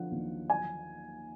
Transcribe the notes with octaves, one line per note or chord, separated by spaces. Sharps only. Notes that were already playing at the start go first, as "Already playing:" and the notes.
Already playing: D3 F3 F#5
D#2
G#5